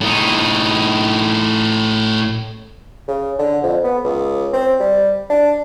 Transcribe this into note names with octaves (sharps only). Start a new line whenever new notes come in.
A2 D#4
C#3
D3
F2
B3
C#2
C4
G3
D4